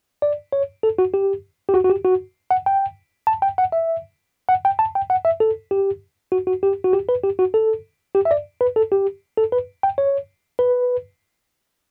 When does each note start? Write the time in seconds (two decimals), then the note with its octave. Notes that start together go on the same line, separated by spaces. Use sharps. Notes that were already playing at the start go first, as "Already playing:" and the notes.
0.22 D5
0.53 C#5
0.83 A4
0.99 F#4
1.14 G4
1.69 G4
1.74 F#4
1.84 F#4
1.90 G4
2.05 F#4
2.51 F#5
2.66 G5
3.27 A5
3.42 G5
3.58 F#5
3.72 E5
4.49 F#5
4.65 G5
4.79 A5
4.95 G5
5.10 F#5
5.25 E5
5.40 A4
5.71 G4
6.32 F#4
6.47 F#4
6.63 G4
6.84 F#4
6.93 G4
7.09 B4
7.24 G4
7.39 F#4
7.54 A4
8.15 G4
8.25 E5
8.31 D5
8.61 B4
8.76 A4
8.92 G4
9.38 A4
9.52 B4
9.83 G5
9.98 C#5
10.59 B4